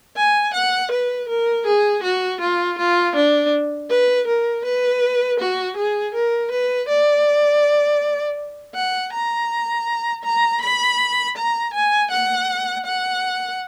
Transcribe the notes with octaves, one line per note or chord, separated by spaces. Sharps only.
G#5
F#5
B4
A#4
G#4
F#4
F4
F4
D4
B4
A#4
B4
F#4
G#4
A#4
B4
D5
F#5
A#5
A#5
B5
A#5
G#5
F#5
F#5